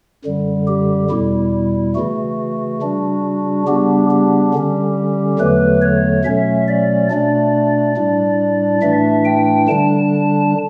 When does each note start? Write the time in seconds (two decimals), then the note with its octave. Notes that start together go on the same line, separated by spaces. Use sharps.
0.25 F#2 D3 G3
0.67 G4
1.10 E2 B2 G3 E4
1.96 C#3 E3 A3 F#4
2.82 C#3 G3 D4
3.67 C#3 G3 B3 D4 G4
4.10 G4
4.54 D3 G3 C#4
5.39 E2 D3 F#3 A3 B4
5.82 C#5
6.25 B2 F#3 A3 C#4 E5
6.68 D5
7.10 B2 A3 D4 D5
7.96 A2 G3 D4
8.82 A2 E3 A3 D4 E5
9.25 G5
9.68 D3 G3 D4 A5